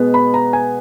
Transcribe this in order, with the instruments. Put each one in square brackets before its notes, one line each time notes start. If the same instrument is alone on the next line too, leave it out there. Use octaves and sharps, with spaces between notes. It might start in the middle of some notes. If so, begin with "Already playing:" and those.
Already playing: [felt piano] B2 G#3 B3
B5
A#5
G#5